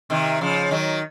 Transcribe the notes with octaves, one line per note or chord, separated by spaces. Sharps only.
C3 D#3
C#3 F3
D#3 F#3